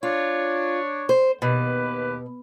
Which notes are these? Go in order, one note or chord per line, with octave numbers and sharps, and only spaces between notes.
D4 F4 C#5
C5
D#2 B2 G4 B4